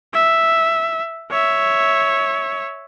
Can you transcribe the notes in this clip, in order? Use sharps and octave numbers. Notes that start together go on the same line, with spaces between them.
E5
C#5 E5